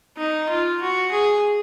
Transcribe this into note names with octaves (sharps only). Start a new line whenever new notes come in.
D#4
F4
F#4
G#4